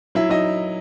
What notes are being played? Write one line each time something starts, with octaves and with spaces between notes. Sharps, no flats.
F#3 E4 E5
F#3 D#4 D#5